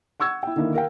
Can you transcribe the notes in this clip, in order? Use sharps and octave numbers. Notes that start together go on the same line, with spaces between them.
F#5 C#6 E6 G#6
E4 G5
D3 D#3 A#3 E4
A#4 F5 G5